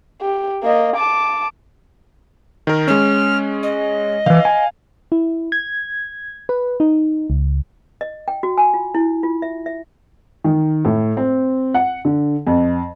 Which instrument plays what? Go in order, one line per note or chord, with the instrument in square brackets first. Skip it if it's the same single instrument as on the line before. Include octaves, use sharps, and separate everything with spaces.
[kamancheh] G4
A#3 D#5
A5 D6
[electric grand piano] D#3 A#4
[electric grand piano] G#3 C#4 [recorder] F6
[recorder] D#5
[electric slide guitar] D#3 E3 [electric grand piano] F5
[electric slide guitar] G#5
[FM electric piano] E4
G#6
B4
D#4
C#2
[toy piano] D#5
G5
F#4
G#5
F4
E4
F4
E5
E5
[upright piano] D#3
A2
C4
F#5
D3
F2